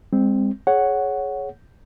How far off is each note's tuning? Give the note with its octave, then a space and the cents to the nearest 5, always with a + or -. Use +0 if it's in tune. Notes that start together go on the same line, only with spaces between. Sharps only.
G#3 -35 C4 +0
G#4 +15 C#5 +0 F#5 +0